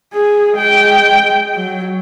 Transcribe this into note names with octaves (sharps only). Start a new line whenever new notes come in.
G#4
G#3 G5
F#3